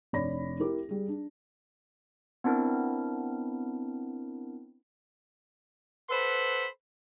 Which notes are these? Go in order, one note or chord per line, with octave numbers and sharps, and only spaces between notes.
F1 D4 C#5 D5 B5 A#6
E4 G4 A#4 D6
G3 G#4
D4
B3 C4 D4 E4 A#4
A4 B4 C5 F#5 B5